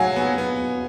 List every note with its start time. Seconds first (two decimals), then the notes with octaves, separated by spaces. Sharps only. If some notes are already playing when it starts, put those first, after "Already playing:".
Already playing: F#3 F5 F#5 G#5
0.16 B3
0.38 B3